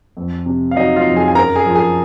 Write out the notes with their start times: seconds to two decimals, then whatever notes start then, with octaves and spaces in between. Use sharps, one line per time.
0.17 F2
0.46 C3
0.71 F5
0.76 F#3 D#4 D#5
0.96 F4 F5
1.06 F2
1.16 G#4 G#5
1.28 G#5
1.35 F#2 A#4 A#5
1.56 G#4 G#5
1.66 F3
1.75 G#4 G#5